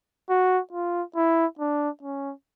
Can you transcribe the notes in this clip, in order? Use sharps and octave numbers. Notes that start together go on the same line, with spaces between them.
F#4
F4
E4
D4
C#4